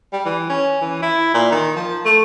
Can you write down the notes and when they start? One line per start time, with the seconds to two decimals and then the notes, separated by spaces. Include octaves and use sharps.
0.13 G3
0.26 E3
0.49 C#4
0.81 E3
1.02 E4
1.34 A#2
1.52 D#3
1.76 F3
2.05 A3